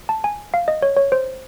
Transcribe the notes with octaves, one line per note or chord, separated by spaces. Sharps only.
A5
G#5
F5
D#5
C#5
C#5
C5